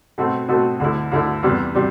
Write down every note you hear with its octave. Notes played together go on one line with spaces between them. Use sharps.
B2 A3 C4 F#4 A4
B2 A3 C4 F#4 A4
D2 D3 A3 E4
D2 D3 A3 E4
E2 C3 G3 B3
C3 G3